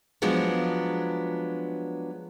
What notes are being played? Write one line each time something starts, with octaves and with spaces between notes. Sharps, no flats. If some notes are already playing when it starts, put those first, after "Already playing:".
F3 F#3 G#3 B3 D4